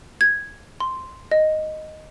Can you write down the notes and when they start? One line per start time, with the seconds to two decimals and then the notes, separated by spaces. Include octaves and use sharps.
0.21 G#6
0.80 C6
1.32 D#5